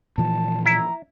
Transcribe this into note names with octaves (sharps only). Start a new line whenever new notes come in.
A#2 E3 F3 A5
E4 A#5